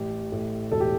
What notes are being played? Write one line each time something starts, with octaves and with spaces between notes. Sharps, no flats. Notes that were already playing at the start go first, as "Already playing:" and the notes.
Already playing: A1 G4
A2
E1 A4
G4